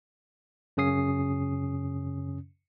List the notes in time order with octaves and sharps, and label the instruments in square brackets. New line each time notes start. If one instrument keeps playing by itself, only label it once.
[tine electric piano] F#2 C#3 C#4 D#6 C7